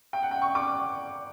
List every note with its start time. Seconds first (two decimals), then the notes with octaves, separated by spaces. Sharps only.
0.13 G5
0.23 F#5
0.31 G5
0.42 C#6
0.55 D6